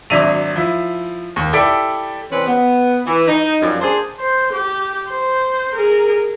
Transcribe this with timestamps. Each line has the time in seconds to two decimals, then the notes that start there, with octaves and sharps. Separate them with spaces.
0.10 G#1 F#3 D4 E5 D#7 F7
0.56 F3 E4
1.36 D#2
1.53 E4 G4 A4 D5 D7
2.31 C3 E3 G3 C4 C#4 B4
2.47 B3
3.06 E3
3.28 D#4
3.62 F#2 F3 G3
3.81 A#3 D4 G#4 C5
4.19 C5
4.53 G4
5.09 C5
5.75 G#4 A#4